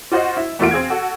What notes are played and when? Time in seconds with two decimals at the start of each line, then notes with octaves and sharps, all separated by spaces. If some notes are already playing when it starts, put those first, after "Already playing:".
0.12 F4 F#4 C5 D#5
0.37 E4
0.59 E2 A3 A#3 F4 F#4 D7
0.71 C4 G#4 F5 G#6
0.90 F#4 A4